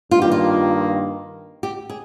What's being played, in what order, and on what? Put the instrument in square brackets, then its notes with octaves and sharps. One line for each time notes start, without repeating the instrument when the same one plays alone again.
[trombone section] G2 D#3 A#3 [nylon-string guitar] F4
[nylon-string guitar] G4
F4
G4
G#4